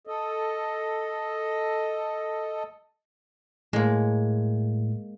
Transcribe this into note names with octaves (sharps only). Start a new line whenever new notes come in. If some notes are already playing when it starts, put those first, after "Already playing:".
A4 D#5
A2 G#3 A#3